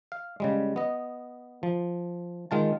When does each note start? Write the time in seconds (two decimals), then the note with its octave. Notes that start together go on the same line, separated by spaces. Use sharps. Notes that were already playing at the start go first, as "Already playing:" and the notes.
0.12 F5
0.40 C#3 G3 G#3
0.76 B3 D#5
1.63 F3
2.51 D#3 G#3 F4 A5